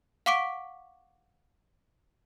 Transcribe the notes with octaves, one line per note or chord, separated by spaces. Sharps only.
F5 F#5 C#6 D6 B6 D7